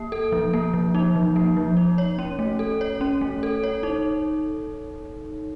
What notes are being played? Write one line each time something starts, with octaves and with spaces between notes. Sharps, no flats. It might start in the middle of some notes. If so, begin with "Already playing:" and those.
Already playing: A#3
A4
F3
A#3
F3
D#4
F3
A#3
F3
D#4
C#5
C#4
A3
A4
C#5
C#4
A3
A4
C#5
D#4